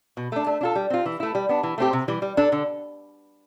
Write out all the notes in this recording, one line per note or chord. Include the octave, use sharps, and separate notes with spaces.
B2
A3 D4
A3
D4 F4 A4
G3
C4 F4
E3
A3 E4
G3
B3 D4
E3
A3 C4 G4
C3
E3 G3
G3
D4 A4
D3